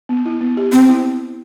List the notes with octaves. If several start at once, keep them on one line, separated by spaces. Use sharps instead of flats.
B3
E4
B3
G4
B3 C4
E4